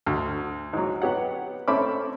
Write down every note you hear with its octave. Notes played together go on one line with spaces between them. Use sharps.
D2
G#2 F#3
B3 G4 C#5 F#5
A3 C4 C#4 E5 B5 D6